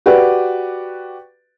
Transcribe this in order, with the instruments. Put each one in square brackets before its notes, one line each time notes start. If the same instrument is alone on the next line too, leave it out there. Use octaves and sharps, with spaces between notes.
[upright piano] F#4 G4 B4 D5